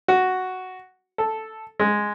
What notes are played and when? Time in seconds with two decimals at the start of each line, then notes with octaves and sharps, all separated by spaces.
0.08 F#4
1.18 A4
1.80 G#3